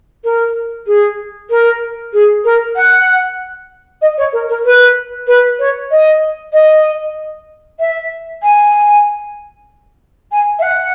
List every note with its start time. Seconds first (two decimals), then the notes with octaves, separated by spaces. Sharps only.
0.24 A#4
0.87 G#4
1.50 A#4
2.13 G#4
2.44 A#4
2.75 F#5
4.01 D#5
4.17 C#5
4.33 A#4
4.49 A#4
4.65 B4
5.27 B4
5.59 C#5
5.91 D#5
6.53 D#5
7.79 E5
8.42 G#5
10.31 G#5
10.59 E5
10.62 F#5